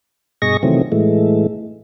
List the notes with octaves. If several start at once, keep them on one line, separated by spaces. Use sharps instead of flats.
G2 B2 G#4 D#5 C#6 A#6
C3 D#3 E3 F#3 A3 C4
A2 E3 G#3 A3